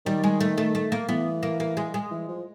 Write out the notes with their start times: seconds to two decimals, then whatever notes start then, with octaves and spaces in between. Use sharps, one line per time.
0.06 D#3 G3
0.24 G#3
0.40 A3
0.58 A3
0.75 A3
0.92 A#3
1.09 E3 B3
1.43 A#3
1.60 A#3
1.77 G#3
1.94 G#3
2.11 E3
2.28 F3